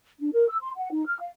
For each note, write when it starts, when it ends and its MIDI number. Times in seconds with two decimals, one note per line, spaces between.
0.20 0.30 62
0.34 0.45 70
0.49 0.57 88
0.62 0.71 84
0.76 0.90 78
0.91 1.03 63
1.07 1.19 89
1.19 1.29 77